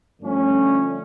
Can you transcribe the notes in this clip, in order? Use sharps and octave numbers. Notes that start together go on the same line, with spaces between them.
G2 D3 F3 A3 C#4